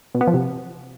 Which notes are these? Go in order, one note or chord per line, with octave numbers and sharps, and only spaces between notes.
B2
B3
F3
C3